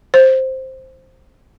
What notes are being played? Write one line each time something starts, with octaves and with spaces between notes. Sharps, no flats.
C5